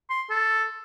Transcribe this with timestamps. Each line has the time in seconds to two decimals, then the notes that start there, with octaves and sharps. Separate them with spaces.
0.10 C6
0.30 A4